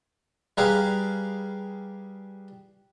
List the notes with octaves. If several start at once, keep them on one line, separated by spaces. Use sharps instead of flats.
G3 G#4 B4 F5 A#5 D6